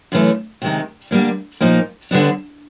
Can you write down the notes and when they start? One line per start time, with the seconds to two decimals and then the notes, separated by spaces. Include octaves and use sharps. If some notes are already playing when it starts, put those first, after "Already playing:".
0.12 F#2 C#3 E3 A3
0.62 C3 D#3 G#3
1.11 D3 G3 A#3 D4
1.61 A#2 F3 A#3 D#4
2.11 D#2 D3 G3 B3 D4